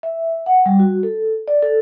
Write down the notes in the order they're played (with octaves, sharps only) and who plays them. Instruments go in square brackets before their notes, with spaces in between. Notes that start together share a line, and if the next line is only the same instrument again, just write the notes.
[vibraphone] E5
F#5
G3
F#4
A4
D5
A4